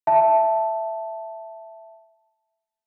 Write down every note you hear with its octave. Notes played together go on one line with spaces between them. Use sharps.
E5 A5